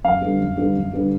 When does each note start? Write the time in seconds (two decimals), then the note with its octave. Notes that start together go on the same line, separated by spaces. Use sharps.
0.04 F#2 F5
0.21 D3 G3 B3 D4
0.40 F#2
0.57 D3 G3 B3 D4
0.75 F#2
0.93 D3 G3 B3 D4